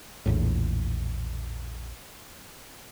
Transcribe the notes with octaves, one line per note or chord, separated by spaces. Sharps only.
A#1 E2 A2